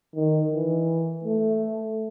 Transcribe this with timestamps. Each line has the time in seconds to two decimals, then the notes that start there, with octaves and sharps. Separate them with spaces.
0.15 D#3
0.52 E3
1.24 A3